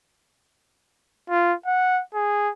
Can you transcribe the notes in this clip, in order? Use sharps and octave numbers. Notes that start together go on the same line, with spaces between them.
F4
F#5
G#4